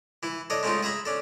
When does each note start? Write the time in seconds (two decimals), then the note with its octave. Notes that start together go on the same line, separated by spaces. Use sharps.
0.23 E3 E4
0.50 D4 A4 C#5 D#5
0.63 G#3 A3 C4 C#4 D#4 F4
0.83 G#4 E5 A#5 B5
1.05 C#4 D4 A4